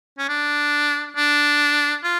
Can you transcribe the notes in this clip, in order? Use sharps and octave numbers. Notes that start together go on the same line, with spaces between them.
C#4
D4
D4
F4